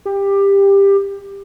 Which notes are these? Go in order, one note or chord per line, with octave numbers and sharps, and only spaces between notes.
G4